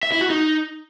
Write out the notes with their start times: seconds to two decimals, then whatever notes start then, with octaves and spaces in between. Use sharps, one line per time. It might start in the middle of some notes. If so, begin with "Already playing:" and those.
0.03 E5
0.12 E4
0.21 F#4
0.30 D#4